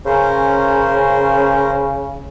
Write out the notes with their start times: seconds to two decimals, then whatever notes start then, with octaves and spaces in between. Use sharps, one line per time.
0.06 C#3 C#4 A#4 C5